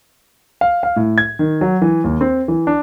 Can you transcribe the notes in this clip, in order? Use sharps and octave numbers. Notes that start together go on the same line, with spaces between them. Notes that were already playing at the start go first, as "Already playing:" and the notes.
F5
F5
A2
G#6
D#3
F#3
E3
D#2
C4
E3
D4